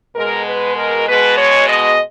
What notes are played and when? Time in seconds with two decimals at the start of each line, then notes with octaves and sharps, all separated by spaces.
0.15 B2 G#3 A#4
0.46 B4
0.77 A#4
1.07 B2 G#3 B4
1.38 C#5
1.68 D#5